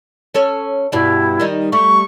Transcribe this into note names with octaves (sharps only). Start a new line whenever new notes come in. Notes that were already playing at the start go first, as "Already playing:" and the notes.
C#4 A4 C#5
G2 B2 G3 E4
D#3 G3 D#4
G3 A3 C#6